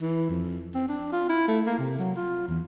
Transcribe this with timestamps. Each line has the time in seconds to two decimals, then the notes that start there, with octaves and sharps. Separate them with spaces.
0.01 E3
0.30 F2
0.74 C4
0.88 D4
1.12 F4
1.29 E4
1.48 A3
1.67 A#3
1.79 C3
1.99 F#3
2.16 F4
2.48 E2